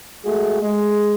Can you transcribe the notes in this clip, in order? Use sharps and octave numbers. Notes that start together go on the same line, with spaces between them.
G#3 A3 F#4 G#4
G#3